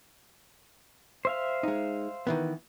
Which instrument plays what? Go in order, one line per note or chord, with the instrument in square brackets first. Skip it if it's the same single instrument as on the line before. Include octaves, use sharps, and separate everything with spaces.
[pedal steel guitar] C5 E5 F5
[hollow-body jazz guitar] G#3 D#4
D#3 E3 B3